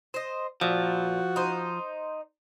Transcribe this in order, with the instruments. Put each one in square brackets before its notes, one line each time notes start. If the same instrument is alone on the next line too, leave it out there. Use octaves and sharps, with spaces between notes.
[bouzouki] C5 D#5
[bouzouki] A#2 [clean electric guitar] F3 [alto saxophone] F#4
[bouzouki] D#4 C5